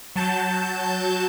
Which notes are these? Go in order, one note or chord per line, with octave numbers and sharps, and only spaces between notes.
F#3 A5 G6